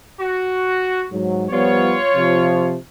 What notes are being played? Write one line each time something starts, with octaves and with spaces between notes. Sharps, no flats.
F#4
G#2 F#3
F3 G3 B3 F4 C#5
C3 F3